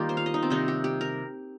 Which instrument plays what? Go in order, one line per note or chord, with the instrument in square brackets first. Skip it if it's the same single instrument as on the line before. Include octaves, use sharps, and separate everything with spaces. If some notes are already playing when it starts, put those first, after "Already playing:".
Already playing: [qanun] D#3 G3 A#3 D#4 F4 G4
C5
F5
D#5
D#4
C4
C3 D#3 G3 D#4
G4
G4
A#4